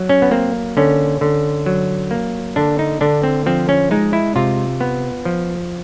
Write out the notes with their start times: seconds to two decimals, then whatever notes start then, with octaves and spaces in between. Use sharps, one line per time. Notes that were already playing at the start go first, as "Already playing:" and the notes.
Already playing: F#3
0.09 C#4
0.22 B3
0.31 A#3 C4
0.77 D3 C#4
1.21 D3
1.66 F#3
2.11 A#3
2.56 D3 D4
2.79 D#4
3.01 D3 D4
3.23 C4
3.46 F3 C4
3.69 C#4
3.91 G#3 D#4
4.13 E4
4.36 C3 F4
4.81 B3
5.25 F3